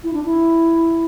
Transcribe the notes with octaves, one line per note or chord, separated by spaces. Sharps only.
E4
D4
E4